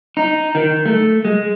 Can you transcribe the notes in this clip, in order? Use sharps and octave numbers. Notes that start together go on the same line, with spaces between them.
D#4
D#3
A3
G#3